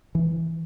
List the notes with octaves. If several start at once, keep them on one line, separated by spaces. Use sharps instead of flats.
E3